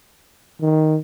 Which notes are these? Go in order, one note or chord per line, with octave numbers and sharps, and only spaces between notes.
D#3